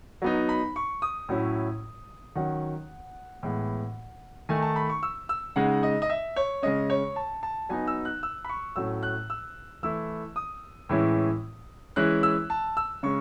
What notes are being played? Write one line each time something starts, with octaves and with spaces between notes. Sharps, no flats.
F#3 B3 D#4
B5
C#6
D#6
A2 F#3 C#4 E4
D#3 F#3 C#4 F#5
A2 E3 G#3 B3
D#3 A3 D#4 G#5
A5
B5
C#6
E6
E6
C#3 G#3 D#4 F#5
D#5
D#5
E5
C#5
C#3 G#3 C#4 D#5
C#5
A5
A5
F#3 B3 D#4 G#5
E6
F#6
E6
B5
C#6
A2 F#3 A3 C#4 E6
F#6
E6
E3 A3 E4 E6
D#6
A2 E3 G#3 C#4 E4
E3 G#3 C#4 E4 F#6
E6
A5
E6
C#3 G#3 C#4 C#6